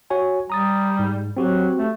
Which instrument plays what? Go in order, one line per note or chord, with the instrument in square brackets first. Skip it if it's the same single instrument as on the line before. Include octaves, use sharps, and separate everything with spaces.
[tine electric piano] F#4 C#5 G#5
[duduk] G3 [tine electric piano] A#5 D#6 A6
[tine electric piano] G#2
[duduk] F#3 [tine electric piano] C4 F#4 G4
[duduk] A3